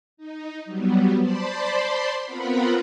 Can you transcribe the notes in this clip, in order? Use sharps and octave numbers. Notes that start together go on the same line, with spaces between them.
D#4
F#3 G3 B3
C5 D5 A5 B5 C6
B3 C4 F4 A#4 F#5 B5